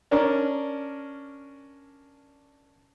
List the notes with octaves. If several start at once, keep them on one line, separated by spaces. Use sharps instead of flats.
C#4 D4 A#4 D5